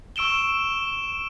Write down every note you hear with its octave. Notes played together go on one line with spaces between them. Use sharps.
C#6 E6 D7 E7 G7